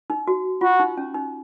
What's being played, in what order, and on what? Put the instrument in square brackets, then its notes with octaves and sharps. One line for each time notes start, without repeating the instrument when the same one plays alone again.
[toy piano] D#4
F#4
[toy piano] F4 [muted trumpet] F#4
[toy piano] D#4
C#4
D#4